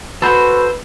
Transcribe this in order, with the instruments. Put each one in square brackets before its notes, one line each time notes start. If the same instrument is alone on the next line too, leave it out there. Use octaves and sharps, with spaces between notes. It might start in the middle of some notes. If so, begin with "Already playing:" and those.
[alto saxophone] F#4 [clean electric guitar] A4 C5 [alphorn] B4 [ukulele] B5